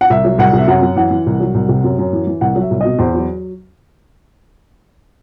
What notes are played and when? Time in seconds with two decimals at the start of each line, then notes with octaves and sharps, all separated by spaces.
0.01 F#5
0.10 C2 E5
0.25 F#3
0.38 C2 F#5
0.53 C3
0.58 E5
0.67 F#2 F#5
0.82 F#2
0.96 E3 F#5
1.11 E3
1.26 C2
1.40 F#3
1.54 C2
1.69 C3
1.84 F#2
1.99 F#2
2.13 E3
2.27 E3
2.41 C2 F#5
2.56 F#3
2.61 E5
2.71 C2
2.81 B2 D#5
2.99 E2 C5
3.14 F#3